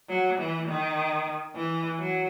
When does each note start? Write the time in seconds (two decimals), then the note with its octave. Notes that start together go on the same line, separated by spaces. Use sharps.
0.09 F#3
0.39 E3
0.68 D#3
1.56 E3
1.99 F#3